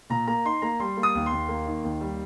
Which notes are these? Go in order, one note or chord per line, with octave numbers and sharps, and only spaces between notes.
A#2 A#5
A#3 A#5
D#4 C6
A#3 A#5
G3 C6
A#3
D#6
D#2
C6
D#2
A#3
D#3
D#2
G3